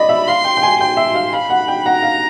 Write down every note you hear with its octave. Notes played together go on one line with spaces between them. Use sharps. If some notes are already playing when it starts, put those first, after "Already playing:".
Already playing: D5 D#5 B5
E5
F5 C6
G5
G5
G#5
G5 C6
E5
F5
F5 B5
F#5
G5
F#5 A#5
F5